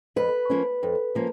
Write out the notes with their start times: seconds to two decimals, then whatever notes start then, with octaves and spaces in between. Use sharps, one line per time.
0.16 F2 B4
0.50 F3 A#3 C#4
0.83 F2
1.15 F3 A#3 C#4